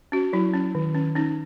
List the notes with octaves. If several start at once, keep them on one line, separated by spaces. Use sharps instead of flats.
C#4 F#4
F#3 E4
C#4
D#3
C#4
C#4 D#4